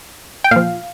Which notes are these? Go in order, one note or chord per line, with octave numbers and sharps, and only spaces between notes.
G5
A#2 F3 F5